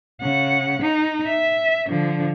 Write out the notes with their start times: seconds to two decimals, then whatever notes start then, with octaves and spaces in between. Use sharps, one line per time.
0.21 C#3 F#5
0.82 D#4
1.27 E5
1.89 D3 F3